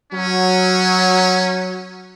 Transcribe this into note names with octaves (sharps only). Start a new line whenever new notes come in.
F#3 C#4